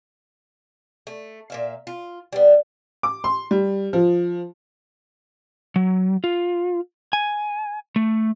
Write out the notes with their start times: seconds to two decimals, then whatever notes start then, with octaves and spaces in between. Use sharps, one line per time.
1.07 A3
1.50 A#2 E5 F5
1.87 F4
2.32 G3 B3
3.03 D6
3.24 C6
3.51 G3
3.93 F3
5.76 F#3
6.24 F4
7.13 G#5
7.96 A3